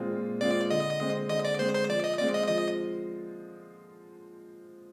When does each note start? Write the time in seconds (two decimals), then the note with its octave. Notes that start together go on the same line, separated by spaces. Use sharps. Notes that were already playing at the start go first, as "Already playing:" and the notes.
Already playing: A#2 G#3 C4 F4
0.12 A#2
0.41 G#3 C4 F4 D5
0.70 D3 D#5
1.01 G#3 C4
1.30 D3 D#5
1.45 D5
1.59 G#3 C4 C5
1.75 C5
1.89 F3 D5
2.04 D#5
2.19 G#3 C4 F4 D5
2.34 D#5
2.48 F3 D#5